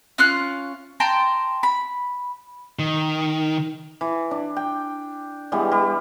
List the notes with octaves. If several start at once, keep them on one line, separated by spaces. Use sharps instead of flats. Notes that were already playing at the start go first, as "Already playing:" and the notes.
C#4 F4 F#6
G5 A5 A#5 C6
B5
D#3
E3
D4
G5
E3 G3 G#3 B3
G3